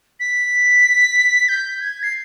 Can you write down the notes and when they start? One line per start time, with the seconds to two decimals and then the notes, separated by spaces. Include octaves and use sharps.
0.20 B6
1.49 G6
1.80 G#6
2.03 C7